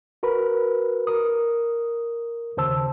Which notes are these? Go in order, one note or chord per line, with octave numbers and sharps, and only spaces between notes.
F#4 A#4 B4 B5
A#4 D#6
D#2 C#3 C5 A5 E6